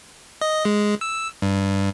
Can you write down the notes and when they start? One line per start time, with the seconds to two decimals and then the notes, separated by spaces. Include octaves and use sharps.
0.41 D#5
0.65 G#3
1.01 E6
1.42 G2